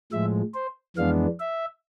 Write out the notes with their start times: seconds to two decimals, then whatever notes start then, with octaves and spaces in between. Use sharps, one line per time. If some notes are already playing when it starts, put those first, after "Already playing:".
0.12 A2 F3 G#3 E5
0.54 C5
0.96 F2 E3 G#3 B3 D4 F5
1.40 E5